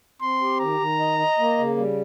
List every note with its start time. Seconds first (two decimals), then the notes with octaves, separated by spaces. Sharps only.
0.22 C4 C6
0.41 G4
0.60 D#3 A#5
0.80 D#3
1.00 D#5
1.19 D#5
1.39 A#3
1.58 C#3
1.77 G3